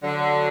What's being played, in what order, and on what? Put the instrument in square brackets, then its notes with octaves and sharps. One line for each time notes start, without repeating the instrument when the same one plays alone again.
[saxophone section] D3 F#3